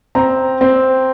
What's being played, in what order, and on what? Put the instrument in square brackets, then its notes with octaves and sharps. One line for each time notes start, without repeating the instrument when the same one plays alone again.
[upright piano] C4 A#5
C4